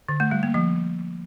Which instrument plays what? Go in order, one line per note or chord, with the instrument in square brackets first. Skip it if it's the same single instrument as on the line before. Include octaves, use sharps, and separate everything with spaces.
[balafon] D3
A3
G3
A#3
F3